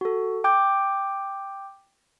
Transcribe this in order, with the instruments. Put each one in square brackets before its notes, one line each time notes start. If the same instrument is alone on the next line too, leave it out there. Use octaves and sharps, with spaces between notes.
[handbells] F#4 A4
G5 D6 G6